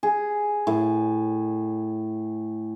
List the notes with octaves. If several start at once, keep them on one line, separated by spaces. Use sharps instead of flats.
G#4
A2